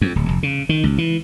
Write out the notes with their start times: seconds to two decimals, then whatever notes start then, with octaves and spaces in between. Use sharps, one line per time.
0.01 F2
0.16 D1
0.29 F1
0.43 C#3
0.69 D#3
0.84 C#2
0.98 E3